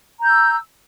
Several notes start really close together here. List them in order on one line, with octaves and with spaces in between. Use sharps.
A#5 G6 E6